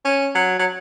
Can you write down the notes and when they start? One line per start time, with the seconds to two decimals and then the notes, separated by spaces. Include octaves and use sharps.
0.05 C#4
0.35 F#3
0.59 F#3